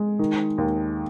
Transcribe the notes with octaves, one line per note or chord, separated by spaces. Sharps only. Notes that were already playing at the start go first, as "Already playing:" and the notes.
Already playing: G#3
D#3
D#2